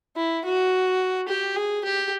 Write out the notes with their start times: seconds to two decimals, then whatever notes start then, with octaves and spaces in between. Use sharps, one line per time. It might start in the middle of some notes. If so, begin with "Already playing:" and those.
0.16 E4
0.45 F#4
1.28 G4
1.56 G#4
1.84 G4